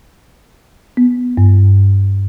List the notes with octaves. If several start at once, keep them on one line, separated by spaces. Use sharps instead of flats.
B3
G2